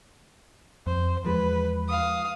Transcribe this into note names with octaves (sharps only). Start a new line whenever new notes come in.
F2 C5
E2 F3 G#3 B4
F5 D#6